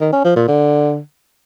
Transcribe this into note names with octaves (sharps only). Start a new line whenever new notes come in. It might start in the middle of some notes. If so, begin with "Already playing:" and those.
D#3
C#4
F3
A#2
D3